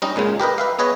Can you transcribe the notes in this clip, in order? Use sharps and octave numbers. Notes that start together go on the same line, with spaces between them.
G3 C#4 D#4 D#5
C#2 A#2 C#3 G#3
G4 A#4 B4 D#5
B4 E5 F5
B3 G#4 B4 C#5 D#5